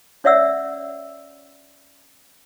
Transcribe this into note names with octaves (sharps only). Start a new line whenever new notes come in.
C#4 C#5 D5 E5 F#5 E6